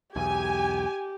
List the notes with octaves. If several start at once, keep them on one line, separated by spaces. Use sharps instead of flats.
B1 E2 G4 G#5